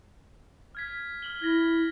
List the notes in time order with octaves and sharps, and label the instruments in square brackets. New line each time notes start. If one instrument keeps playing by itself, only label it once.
[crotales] F6 G#6 B6
F6 F#7 G7
[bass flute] E4 [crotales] G#6 A#6